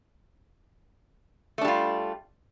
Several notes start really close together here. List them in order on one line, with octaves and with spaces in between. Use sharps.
A3 D4 G3 F4